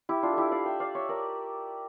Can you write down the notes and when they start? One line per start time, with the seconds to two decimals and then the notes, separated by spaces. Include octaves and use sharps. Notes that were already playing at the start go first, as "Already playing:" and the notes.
0.09 E4 G4
0.23 D4 F4
0.33 E4 G4 A4
0.51 D5 F5
0.66 E5 G5
0.80 D5 F5
0.95 C#5 E5
1.09 A#4 D5